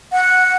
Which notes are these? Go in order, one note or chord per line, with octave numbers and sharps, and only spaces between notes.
F#5